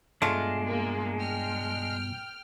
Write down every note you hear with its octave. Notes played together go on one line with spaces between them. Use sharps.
G2 B2 G#3 A3 D4 F4
A#3
G5 F6